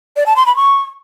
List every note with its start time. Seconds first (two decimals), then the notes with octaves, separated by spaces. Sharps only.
0.16 D5
0.26 A5
0.36 C6
0.46 B5
0.56 C#6